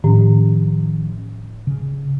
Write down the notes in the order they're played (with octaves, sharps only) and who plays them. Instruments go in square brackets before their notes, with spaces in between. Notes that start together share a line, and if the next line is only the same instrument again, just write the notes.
[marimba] A2 [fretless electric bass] D#3 F3 C#4
[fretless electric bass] C#3